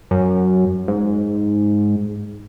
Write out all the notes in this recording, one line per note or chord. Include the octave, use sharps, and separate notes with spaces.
F#2
G#2